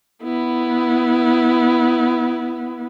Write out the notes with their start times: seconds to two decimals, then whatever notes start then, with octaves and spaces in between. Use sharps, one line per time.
0.24 B3 E4